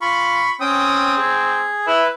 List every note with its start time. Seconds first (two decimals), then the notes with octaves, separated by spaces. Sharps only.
0.02 F4 B5 C#6
0.61 C4 C#4 G5 D#6
1.18 G#4
1.87 E4 B4